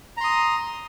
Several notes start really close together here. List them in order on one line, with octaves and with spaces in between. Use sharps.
A#5 C6 D#6